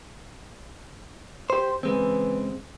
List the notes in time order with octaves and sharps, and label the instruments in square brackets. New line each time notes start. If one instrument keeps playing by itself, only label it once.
[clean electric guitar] G4 C5
[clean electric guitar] C#3 G#3 C4 [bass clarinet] E3